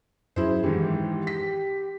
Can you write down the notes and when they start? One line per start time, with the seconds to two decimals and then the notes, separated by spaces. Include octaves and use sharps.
0.36 F#2 E4 G#4 C5
0.64 G#2 D#3 E3 G4
1.27 B6